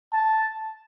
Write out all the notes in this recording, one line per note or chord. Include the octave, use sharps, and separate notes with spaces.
A5